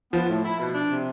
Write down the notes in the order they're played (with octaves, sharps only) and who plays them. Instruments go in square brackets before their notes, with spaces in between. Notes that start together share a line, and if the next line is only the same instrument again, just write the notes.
[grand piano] F3 [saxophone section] B3
[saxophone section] A2
E4
B2
D4
C3